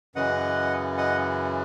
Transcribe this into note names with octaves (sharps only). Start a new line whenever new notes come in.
F#2 C#3 E3 D#5 F#5
D#5 F#5